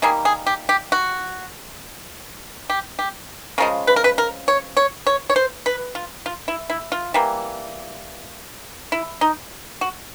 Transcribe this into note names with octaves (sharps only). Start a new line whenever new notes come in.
D#3 G3 A#3 G#4
G#4
G4
G4
F#4
G4
G4
C#3 F3 G#3 A#4
B4
A#4
B4
A#4
C#5
C#5
C#5
C#5
C5
B4
F4
F4
E4
E4
F4
E3 G3 A#3
E4
D#4
F#4